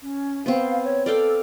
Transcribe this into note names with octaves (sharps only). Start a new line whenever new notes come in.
C#4
B3 C4 F5
C#5
A4 D5 F5 G5